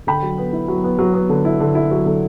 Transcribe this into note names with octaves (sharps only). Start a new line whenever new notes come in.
D3 G5 B5
F#3
B3
E4
F#3
B3
F#3
B3
D3
E4
D3
E4
F#3
D3